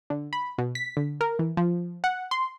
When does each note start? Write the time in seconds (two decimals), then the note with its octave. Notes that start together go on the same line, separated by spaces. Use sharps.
0.10 D3
0.33 B5
0.58 B2
0.75 B6
0.97 D3
1.21 A#4
1.39 E3
1.57 F3
2.04 F#5
2.31 C6